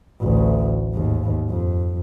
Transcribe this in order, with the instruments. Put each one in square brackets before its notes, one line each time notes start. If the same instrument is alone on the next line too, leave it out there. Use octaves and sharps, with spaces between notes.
[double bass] A1 D2
D#2 G#2
F2